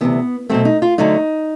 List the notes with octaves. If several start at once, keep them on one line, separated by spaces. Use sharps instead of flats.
D2 C3 E3 B3
B2 F#3 A3 C4
D#4
F4
D2 D3 F#3 A3 D#4